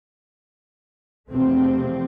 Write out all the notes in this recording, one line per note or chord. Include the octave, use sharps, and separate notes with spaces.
E2 C3 F3 A3 C4